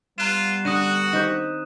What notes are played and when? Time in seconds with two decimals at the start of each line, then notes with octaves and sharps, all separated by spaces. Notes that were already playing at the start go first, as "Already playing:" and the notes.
0.18 G3 B3 F4 A#5 F#6 E7
0.65 D3 F#4 D#6 F#6 D#7
1.13 D#3 C4 G4